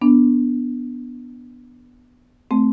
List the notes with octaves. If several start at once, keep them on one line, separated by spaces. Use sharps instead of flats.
B3 D4
A3 C4